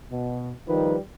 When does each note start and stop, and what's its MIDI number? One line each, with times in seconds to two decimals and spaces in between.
0.12 0.51 47
0.68 0.97 51
0.68 0.97 53
0.68 0.97 55
0.68 0.97 63
0.68 0.97 71